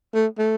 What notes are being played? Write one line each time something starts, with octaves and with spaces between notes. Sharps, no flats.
A3
A3